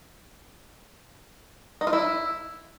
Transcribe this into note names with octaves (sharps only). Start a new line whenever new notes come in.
D#4
F4
E4